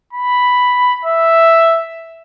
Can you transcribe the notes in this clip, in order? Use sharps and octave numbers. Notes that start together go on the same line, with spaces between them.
B5
E5